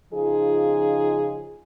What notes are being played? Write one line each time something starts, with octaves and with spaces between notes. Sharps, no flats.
C#3 F3 D#4 F4 G#4